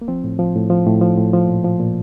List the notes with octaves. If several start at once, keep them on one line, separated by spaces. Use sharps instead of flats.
A#3
F3 C4
A2
F3
A2
F3
A2
F3
A2
F3
A#2
F3
A#2